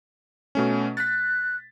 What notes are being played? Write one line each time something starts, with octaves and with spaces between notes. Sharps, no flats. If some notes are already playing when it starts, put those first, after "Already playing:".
B2 A3 C#4
F#6 A6 B6